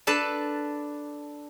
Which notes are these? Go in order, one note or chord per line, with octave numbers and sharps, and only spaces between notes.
D4 A4 B4 A5